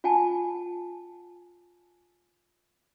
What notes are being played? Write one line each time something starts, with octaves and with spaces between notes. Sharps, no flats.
F4 F#5 G#5 A5